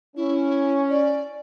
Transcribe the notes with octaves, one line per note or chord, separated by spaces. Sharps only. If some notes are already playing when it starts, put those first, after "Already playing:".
C#4 E4
D5